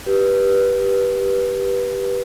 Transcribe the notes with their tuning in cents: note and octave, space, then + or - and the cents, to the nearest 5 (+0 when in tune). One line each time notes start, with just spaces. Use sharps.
G4 +0 B4 -15